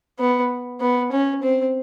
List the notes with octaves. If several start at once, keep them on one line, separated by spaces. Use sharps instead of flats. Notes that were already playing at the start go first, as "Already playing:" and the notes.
B3
B3
C#4
C4